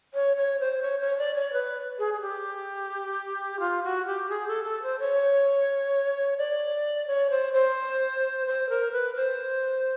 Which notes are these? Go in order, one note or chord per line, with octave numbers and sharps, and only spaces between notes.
C#5
C#5
C5
C#5
C#5
D5
C#5
B4
G#4
G#4
G4
F4
F#4
G4
G#4
A4
A4
C5
C#5
D5
C#5
C5
C5
C5
A#4
B4
C5